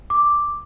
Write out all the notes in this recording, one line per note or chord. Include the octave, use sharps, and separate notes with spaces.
D6